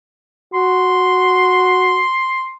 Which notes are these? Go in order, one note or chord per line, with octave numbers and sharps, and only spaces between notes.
F#4 C6